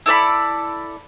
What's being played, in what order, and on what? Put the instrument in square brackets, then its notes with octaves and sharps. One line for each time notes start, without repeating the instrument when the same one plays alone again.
[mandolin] E4 A4 D5 B5